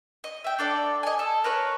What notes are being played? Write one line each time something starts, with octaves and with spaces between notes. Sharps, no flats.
D#5
E5 G5
D4 A4 D5
D#5 G#5
A4
A#4 B4 C#5